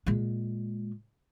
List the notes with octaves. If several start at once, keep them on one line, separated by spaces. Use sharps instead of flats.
A#2 G#3